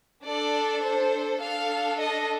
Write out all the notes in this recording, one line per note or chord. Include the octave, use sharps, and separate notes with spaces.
D4 A4 D5
C5
D4 A4 F5
D#5